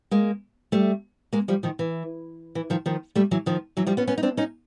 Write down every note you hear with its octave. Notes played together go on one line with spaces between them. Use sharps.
G#3 A#3
G3 A3
G#3 A#3
F3 G3
D#3 F3
E3
E3
D#3 F3
D#3 F3
G3 A3
E3 F#3
D#3 F3
E3 F#3
F3 G3
B3 C#4
B3 C#4
D#4
C4 D4
C#4 D#4